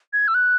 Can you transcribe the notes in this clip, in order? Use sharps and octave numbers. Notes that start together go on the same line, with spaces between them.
G#6
E6
F#6